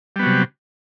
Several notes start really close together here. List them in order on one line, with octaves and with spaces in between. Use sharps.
G3 B3 F#3 C3